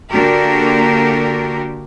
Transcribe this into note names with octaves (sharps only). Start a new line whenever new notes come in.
D3 A#3 D4 F#4 G4 A#4